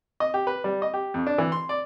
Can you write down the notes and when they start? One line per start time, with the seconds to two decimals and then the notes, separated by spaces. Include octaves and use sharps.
0.20 D#5
0.34 G4
0.47 B4
0.64 G3
0.82 D#5
0.94 G4
1.14 F2
1.27 D4
1.38 E3
1.52 C6
1.69 D5